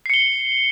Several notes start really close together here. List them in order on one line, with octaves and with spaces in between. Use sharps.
C7 C#7 G7